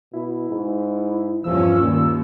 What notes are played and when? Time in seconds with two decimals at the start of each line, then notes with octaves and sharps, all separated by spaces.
0.13 B2 E4
0.49 G#2
1.44 E2 G2 F3 C#4 E6
1.80 D#2 A#2